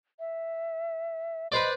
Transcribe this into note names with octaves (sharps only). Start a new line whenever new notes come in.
E5
B4 C5 D5 D#5